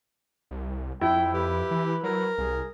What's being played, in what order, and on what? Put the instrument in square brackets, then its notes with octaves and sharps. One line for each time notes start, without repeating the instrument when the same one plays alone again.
[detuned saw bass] C2
[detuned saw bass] F2 [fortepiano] E4 [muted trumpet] G5
[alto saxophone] G4 [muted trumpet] B4
[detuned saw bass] E3
[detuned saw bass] F#3 [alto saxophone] A#4
[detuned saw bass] C2 [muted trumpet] G#4